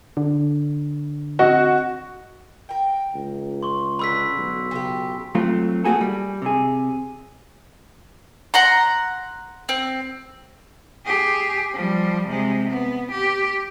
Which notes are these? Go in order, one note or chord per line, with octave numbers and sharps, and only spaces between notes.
D3
C4 F#4 D#5
A#4 G5
C#2
C6 C#6
B2 D3 B4 B5 E6 B6
B1
C#3 F4 G4
F#3 A3 C4 F4
A3 A#3 C4 F#4 G#4 A4
G3
C3 G#4
F#5 A#5 C6
C4
G4 G#4
F3 G3
C3 G#3
B3
G4